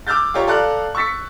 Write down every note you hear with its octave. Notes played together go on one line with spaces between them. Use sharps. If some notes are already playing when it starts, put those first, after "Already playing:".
D6 E6 F6 G6 A6
F4 G4 C#5 A#5
A4 D5 F5 A#5 F#6
C#6 E6 A6 B6 C#7